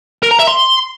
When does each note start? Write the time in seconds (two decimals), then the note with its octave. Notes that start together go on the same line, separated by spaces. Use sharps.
0.23 A#4
0.31 A#5
0.39 E5
0.47 C6